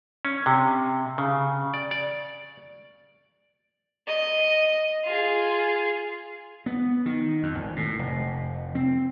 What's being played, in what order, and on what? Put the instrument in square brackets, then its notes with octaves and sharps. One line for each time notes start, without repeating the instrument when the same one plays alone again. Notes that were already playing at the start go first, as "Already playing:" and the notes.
[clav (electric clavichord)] C#4
C3
C#3
D5
D5
[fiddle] D#5 D#6
F4 G#4
[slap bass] B3
D#3
F2
G#1
A2
F1
C4